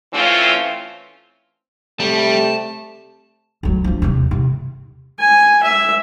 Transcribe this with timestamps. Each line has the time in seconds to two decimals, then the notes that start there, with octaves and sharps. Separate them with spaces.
0.13 E3 A3 C4 C#4 F4
2.00 C3 G3 A3 A5
3.63 D2 F#3
3.84 F3 D4
4.02 D#2 C3
4.31 C3
5.20 G#5
5.63 E5